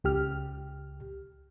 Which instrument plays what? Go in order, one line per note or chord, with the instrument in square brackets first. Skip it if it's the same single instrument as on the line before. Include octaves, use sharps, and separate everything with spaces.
[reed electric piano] C#2 G4 F6